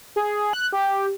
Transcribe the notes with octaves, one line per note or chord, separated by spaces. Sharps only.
G#4
F#6
G4